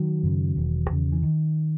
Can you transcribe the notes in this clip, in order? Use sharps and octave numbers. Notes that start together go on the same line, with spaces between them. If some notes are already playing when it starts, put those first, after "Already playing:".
Already playing: D#3 F#3
F#2 C#3
E1
E2 C#3
E3
D#3